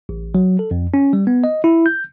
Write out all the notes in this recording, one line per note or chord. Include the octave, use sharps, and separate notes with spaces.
A1
F#3
A4
F2
C#4
G3
B3
D#5
E4
G6